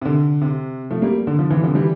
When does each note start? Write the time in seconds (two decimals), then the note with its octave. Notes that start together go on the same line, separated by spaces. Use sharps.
0.02 C3
0.05 D3
0.41 C3
0.91 F3 A3
1.02 G3 A#3
1.27 D3
1.39 D3 F3
1.50 C3 E3
1.63 D3 F3
1.75 E3 G3